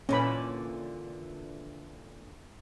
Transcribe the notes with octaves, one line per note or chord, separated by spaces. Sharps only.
A#2 D3 E3 C#4 B5